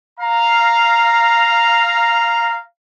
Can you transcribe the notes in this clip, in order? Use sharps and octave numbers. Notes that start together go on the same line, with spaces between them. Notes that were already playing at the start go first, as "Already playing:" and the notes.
F5 A#5